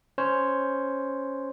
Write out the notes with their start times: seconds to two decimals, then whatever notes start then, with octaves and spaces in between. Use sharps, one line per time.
0.18 C#4 C5 C#5